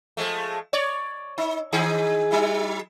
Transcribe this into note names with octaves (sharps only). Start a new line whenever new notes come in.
F3 G#3 A3
C#5 D5
D#4
D#3 D#4 G#4
F#3 D#4 E4